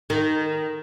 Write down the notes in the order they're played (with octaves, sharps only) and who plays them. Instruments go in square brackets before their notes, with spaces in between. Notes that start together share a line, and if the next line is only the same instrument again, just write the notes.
[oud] D#3